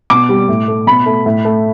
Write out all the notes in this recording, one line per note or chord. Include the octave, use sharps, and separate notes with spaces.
B2 D6
G3
A2
A3
B2 B5
A3
A2
A3